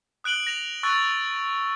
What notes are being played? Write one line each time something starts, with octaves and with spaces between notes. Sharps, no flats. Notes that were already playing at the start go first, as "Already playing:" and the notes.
D#6 F#6 D7 F#7 G7
A#6 F7
C#6 E6 F#6 A6